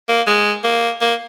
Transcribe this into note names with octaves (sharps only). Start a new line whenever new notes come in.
A#3
G#3
A#3
A#3